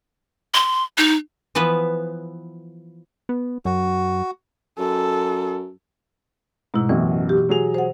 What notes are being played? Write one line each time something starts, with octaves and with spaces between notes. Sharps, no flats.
C6
D#4
E3 F3 B3 B4
B3
F#2 F#4
F#2 A4
G#2 B2 E4
A1 F#2 B2 E3
G4
F#3 G#4 F7
C5 F#5